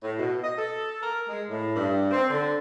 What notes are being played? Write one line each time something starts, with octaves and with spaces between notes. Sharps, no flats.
A2
B2
D#5
A4
A#4
G#3
A2
G2
C4
D3